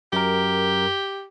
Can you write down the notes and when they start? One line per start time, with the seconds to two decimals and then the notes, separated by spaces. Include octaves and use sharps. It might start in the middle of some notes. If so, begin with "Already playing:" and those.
0.13 F#2 G4 A#4